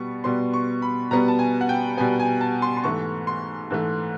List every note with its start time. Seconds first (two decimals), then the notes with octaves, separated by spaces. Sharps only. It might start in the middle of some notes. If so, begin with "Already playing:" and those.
Already playing: B2 G3 B3 C#6
0.24 B2 G3 B3 C6
0.54 C#6
0.82 B5
1.11 B2 G3 B3 A#5
1.28 A5
1.39 G#5
1.61 F#5
1.69 G5
1.97 B2 G3 B3 G#5
2.20 G#5
2.41 A5
2.62 C6
2.77 C6
2.84 G#2 E3 A3 C#6
3.27 C6
3.71 G#2 E3 A3